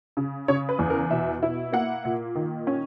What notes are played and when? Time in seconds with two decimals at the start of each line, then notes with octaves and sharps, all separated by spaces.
0.17 C#3
0.48 C#3 C#5
0.69 B4
0.79 E2
0.90 A#4
1.11 B2 E5
1.43 E4
1.73 A#3 F#5
2.05 A#2
2.35 D#3
2.67 C#4